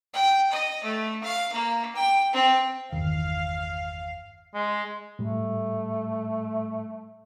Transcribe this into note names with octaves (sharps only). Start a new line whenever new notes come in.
G5
D#5
A3
F5
A#3
G5
C4
G1 E2 D#3 F5
G#3
A2 G3 A3